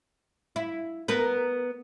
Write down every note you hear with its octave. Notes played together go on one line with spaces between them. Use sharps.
E4
B3 A#4 B4